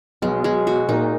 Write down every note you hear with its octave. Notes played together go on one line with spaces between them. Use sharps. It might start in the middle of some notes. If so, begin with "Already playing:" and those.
B1 B2 G#3
G#3
F#4
A#2 A#3 D#4